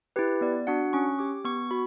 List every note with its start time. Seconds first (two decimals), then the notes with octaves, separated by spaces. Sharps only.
0.16 E4 G4 B4
0.41 B3 D5
0.67 D4 F#4 F#5
0.93 C#4 C#6
1.19 G4 D6
1.45 B3 C#6
1.71 F#4 B5